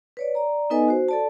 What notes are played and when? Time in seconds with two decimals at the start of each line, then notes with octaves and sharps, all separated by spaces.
0.17 B4 C#5 D5
0.35 D5 A#5
0.70 B3 D#4 A4 B4 D#5 G#5
0.88 F#4 C5
1.08 A4 D5 A5